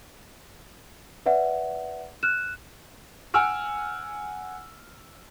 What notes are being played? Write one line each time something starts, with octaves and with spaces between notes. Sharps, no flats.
B4 D5 E5 F#5
F6 F#6 E7
F#5 G#5 E6 F6 D7